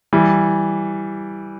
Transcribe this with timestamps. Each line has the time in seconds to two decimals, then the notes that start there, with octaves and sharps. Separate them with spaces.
0.13 E3 G3